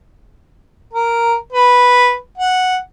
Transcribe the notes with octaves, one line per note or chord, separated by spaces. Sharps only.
A#4
B4
F#5